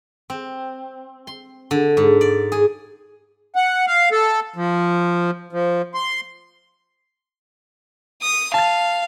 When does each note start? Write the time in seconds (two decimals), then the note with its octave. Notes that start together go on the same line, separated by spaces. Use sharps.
0.30 C4
1.27 C6
1.71 D3
1.97 G#2
2.21 D5
2.52 G#4
3.55 F#5
3.87 F5
4.12 A4
4.56 F3
5.53 F3
5.94 C6
8.22 D#6
8.54 F5 A5 A6